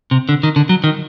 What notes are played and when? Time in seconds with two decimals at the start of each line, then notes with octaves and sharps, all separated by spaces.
0.11 C3
0.29 D3
0.43 D#3
0.56 D3
0.69 F#3
0.84 D#3